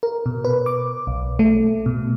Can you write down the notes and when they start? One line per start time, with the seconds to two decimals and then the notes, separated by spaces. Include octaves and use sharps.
0.03 A#4
0.26 B2
0.45 B4
0.66 D6
1.07 B1
1.39 A3
1.86 B2